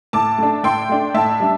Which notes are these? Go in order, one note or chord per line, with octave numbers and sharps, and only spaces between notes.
A2 A5 D6
A3 D4
A2 G5 C6
A3 D4
A2 E5 A5
G3 D4